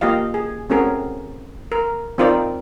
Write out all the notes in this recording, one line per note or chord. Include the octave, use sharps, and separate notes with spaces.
A#3 F4 G4 D#5 F5
G#4
A3 C4 C#4 F#4 G#4 A#4
A#4
C4 D#4 F4 A#4 C5 D5